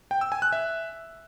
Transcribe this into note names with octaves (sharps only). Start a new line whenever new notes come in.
G5
E6
G#5
F#6
E5